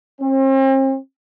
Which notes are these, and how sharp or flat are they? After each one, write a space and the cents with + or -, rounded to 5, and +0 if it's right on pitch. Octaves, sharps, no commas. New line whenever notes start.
C4 +40